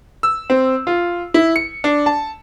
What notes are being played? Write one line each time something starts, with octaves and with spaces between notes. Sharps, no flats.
E6
C4
F4
E4
C#7
D4
A5